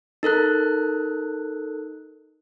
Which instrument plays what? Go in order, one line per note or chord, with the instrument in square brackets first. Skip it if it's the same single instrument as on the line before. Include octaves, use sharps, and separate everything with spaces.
[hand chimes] D#4 A4 A#4 F#6